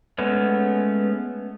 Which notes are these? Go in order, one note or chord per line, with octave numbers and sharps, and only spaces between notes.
G#3 A3 B3 C#4